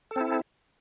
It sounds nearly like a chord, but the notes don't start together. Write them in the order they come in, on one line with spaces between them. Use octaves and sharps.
A4 C4 E4